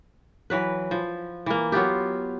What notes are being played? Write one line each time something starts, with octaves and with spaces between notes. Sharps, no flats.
E3 F#3 B4
F3
E3 A#3
F#3 B3 F4 G4